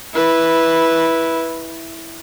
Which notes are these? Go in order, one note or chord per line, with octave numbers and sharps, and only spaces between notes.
E4 B4